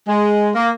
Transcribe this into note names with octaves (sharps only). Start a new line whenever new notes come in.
G#3
A#3